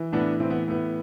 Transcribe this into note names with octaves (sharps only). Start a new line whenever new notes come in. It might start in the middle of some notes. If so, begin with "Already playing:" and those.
Already playing: E3
A2 B3 D4
E3 C4
B3
A2 B3